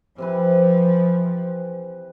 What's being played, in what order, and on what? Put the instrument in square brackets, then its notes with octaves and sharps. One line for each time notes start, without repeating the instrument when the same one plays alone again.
[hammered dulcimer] C3 E3 B4 [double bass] F3